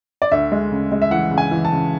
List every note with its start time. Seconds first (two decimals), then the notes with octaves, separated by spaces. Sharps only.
0.22 D5
0.32 D2 E5
0.52 G#3
0.72 C#3
0.92 G#3
1.02 E5
1.11 E3 F#5
1.31 C#3
1.38 G#5
1.51 E3
1.65 A5
1.71 C#3